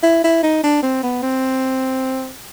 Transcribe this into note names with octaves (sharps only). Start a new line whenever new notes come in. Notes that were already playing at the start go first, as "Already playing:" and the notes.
E4
E4
D#4
D4
C4
B3
C4